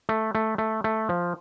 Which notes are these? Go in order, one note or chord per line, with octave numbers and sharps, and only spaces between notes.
A3
A3
A3
A3
F3